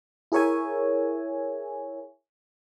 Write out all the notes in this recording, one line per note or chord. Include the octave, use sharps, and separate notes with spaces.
E4 G#4 A#4 C#5 E5 G#5